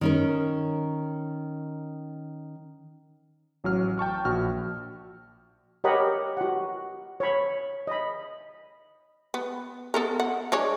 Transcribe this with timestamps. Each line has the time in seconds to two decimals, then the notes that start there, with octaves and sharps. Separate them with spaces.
0.01 D#3 C#4 A#4
3.64 A1 F#3 F6
3.98 G5 A5 C#6 F6
4.25 A#1 F#4 F6
5.84 G4 A#4 C#5 D#5 F#5 B5
6.37 F#4 F#5
7.20 C#5 B5
7.87 D#5 B5
9.34 B3
9.94 B3 A4 A#4
10.20 F#5
10.52 G#3 D4 C#5